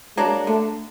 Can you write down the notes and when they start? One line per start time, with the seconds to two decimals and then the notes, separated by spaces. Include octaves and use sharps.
0.17 F#3 G#3 A#3 D4
0.47 D3 A3